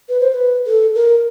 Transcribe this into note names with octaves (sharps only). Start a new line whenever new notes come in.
B4
C5
B4
A4
A#4